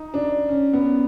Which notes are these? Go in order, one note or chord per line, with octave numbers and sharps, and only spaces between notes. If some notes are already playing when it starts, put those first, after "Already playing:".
Already playing: D#4
D4
C#4
B3